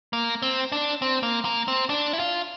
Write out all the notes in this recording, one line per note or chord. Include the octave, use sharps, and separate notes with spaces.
A#3
C4
D4
C4
A#3
A#3
C4
D4
E4
F4